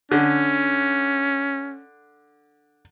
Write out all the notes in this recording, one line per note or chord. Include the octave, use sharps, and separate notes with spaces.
D3 C#4